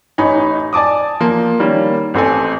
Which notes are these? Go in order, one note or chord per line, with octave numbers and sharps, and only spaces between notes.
A1 D#4 C#5 G#5 B5
D5 G#5 A5 D6 D#6
F3 A#3
D#3 G3 A#3 C#4
A1 C4 A4 G#5